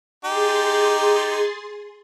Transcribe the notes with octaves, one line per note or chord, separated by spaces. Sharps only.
D#4 G4 G#4 C6 A6